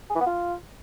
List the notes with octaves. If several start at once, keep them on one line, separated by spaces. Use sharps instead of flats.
G#4
E3
B3
F4